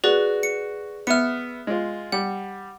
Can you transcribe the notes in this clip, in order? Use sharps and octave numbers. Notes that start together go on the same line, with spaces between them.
F#4 G#4 B4 D5
C#7
B3 E5 F6 C#7
G#3 F4
G3 F#5